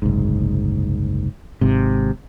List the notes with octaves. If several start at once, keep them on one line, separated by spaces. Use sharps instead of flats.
F#1 C2 G#2
G#1 G#2 C3